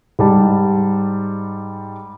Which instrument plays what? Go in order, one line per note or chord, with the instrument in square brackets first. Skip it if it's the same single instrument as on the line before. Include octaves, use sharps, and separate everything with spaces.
[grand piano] G#2 G3 A5